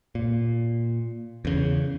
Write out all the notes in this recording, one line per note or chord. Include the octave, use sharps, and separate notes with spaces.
A#2
E2 C#3